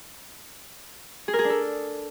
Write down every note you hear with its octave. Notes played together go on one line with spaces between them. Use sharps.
G#4
A#4
G#4
D4
A4